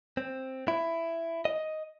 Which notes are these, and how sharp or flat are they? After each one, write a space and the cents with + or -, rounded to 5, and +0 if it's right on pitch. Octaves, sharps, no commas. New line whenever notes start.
C4 +5
E4 +10
D#5 +5